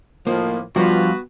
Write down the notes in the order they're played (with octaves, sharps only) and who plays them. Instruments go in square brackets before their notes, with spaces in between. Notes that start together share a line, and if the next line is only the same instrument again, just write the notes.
[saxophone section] A2 D#3 F3 [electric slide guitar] A#3
[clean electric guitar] G2 [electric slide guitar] F3 F4 [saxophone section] B3 F#4